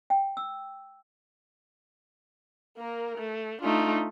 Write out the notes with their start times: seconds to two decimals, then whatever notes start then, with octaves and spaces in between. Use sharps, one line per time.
0.10 G5
0.37 E6
2.77 A#3 A#4
3.17 A3
3.61 A3 D4 D#4 F4